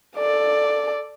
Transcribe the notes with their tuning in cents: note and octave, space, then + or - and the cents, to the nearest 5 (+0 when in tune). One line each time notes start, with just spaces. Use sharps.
A4 +0 D5 +5